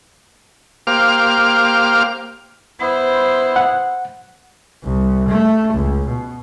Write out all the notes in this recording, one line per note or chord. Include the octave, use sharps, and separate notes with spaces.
A#3 G4 C5 F5 D6 F6
B3 E4 C5
F#5
C2
A3
C#2
B2